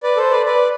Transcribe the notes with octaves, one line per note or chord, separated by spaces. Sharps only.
B4 D5
A4 C5
B4 D5
B4 D5